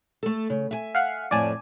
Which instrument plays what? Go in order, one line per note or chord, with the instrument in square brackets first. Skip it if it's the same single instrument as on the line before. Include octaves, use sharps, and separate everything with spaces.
[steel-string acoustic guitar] A3 A4
C#3
E5 G#5
[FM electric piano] F5 F#5
[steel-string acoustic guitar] F2 A2 [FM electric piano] D5 G#5 A5